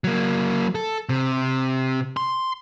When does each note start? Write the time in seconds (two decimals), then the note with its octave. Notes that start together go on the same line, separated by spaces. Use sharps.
0.04 F#3 A#3
0.75 A4
1.09 C3
2.17 C6